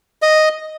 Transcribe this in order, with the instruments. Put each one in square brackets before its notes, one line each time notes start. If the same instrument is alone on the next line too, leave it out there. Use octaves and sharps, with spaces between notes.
[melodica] D#5